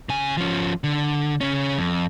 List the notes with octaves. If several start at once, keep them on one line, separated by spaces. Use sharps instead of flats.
C#3 G#5
F3 C#4
D3
C#3 C#4
F2